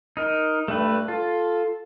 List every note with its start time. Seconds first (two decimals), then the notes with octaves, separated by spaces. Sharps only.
0.17 D#4 A#4
0.68 G2 A3 B4
1.08 F4 A4